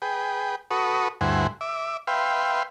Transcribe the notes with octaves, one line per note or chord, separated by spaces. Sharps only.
G#4 B4 G5
F#4 A4 B4 C#6 D#6
D2 G2 E4 C5 F#5 G#5
E5 D6
B4 E5 F5 G5 C6